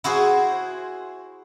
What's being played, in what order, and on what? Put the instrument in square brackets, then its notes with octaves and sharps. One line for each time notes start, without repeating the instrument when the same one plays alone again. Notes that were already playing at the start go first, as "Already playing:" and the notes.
[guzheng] E4 F#4 G#4 C5